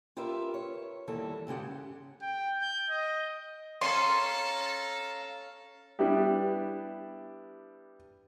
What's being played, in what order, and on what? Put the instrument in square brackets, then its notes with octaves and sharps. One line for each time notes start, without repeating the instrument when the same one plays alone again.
[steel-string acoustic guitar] F4 G4 A#4 B4 E5
C#5
E2 D#3 E3 G3 A#3 A4
G#2 C#3 G#3 G4 F#5
[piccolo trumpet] G5
G6
D#5
[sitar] C#4 [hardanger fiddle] A4 [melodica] F5 A#5 [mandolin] C6
[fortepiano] G3 B3 D4 E4 G4